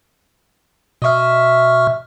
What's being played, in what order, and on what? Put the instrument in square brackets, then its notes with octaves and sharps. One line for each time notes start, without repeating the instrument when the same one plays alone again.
[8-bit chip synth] B2 C#6 F6 [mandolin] D#5 E5